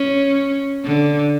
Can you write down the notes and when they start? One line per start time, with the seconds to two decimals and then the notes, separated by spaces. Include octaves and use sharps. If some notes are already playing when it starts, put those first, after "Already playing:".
Already playing: C#4
0.85 D3